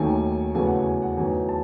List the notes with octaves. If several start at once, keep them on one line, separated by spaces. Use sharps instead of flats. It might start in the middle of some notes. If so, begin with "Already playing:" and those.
Already playing: D#2 D#3 F#3 A3 G#5
E2 C#3 F#3 A3 G#5
F#5
G#5
G#5
F#5
E2 D#3 F#3 A3 G#5
A5